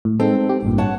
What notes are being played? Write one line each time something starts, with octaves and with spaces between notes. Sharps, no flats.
A2
G#3 C4 D#4 A4
G4
A1 G2 A#2
C#5 F#5 A5